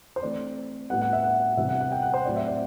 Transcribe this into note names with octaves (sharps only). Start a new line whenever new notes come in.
C5
E3 A3 C4 D5
A2 G3 B3 F#5
F#5
E5
F#5
C3 E3 G3 B3 E5
F#5
F#5
G5
F#5
C5
A2 F#3 C4 D5
E5
D5